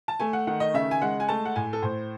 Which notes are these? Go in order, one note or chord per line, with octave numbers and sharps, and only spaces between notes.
A5
A3 G#5
F#5
D#3 F#5
D#5
C#3 E5
G#5
G#3 F#5
G#5
A3 A5
F#5
A2 G#5
A4
A2 C5